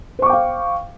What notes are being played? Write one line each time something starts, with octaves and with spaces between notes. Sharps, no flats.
C5 F5 G5 C#6 D6